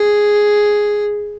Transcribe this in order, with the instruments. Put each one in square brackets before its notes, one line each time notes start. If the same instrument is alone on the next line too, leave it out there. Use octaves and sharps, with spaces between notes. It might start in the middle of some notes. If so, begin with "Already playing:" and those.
Already playing: [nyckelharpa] G#4